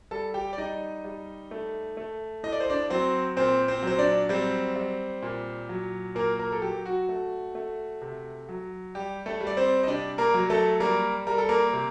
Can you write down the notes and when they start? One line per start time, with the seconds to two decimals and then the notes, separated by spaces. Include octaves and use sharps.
0.11 G3 A4 A5
0.34 G4 G5
0.53 D5
0.58 G3 D#4 D#5
1.04 G3
1.51 A3
1.97 A3
2.43 A2 D#5
2.52 D5
2.60 C5
2.70 D4 D5
2.90 F#3 C4 C5
3.36 A#2 C4 C5
3.68 C4 C5
3.83 F#3 C5
3.98 D4 D5
4.29 G3 C4 C5
4.76 G3
5.22 A#2
5.69 F#3
6.15 A#2 A#3 A#4
6.39 A#3 A#4
6.52 A4
6.62 F#3 G4
6.86 F#4
7.09 A3
7.55 A3
8.02 C3
8.49 F#3
8.95 G3 G4
9.26 A3 A4
9.41 G3
9.47 D5
9.57 C4 C5
9.83 D#5
9.87 C3 D4 D5
10.18 A#3 A#4
10.34 F#3
10.50 A3 A4
10.80 G3 A#3 A#4
11.27 G3 A#4
11.38 A4
11.49 A#3 A#4
11.73 C3